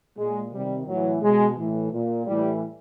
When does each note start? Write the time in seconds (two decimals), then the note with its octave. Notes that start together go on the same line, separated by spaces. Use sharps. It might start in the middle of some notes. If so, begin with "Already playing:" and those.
0.18 A#2 G#3
0.52 C3 D#3 G3
0.88 A2 E3 F#3
1.22 B2 G#3
1.57 A2 E3
1.93 A#2
2.27 A2 E3 G3